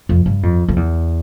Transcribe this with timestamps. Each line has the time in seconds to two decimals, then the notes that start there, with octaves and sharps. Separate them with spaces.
0.09 F2
0.26 G2
0.43 F2
0.68 F2
0.76 E2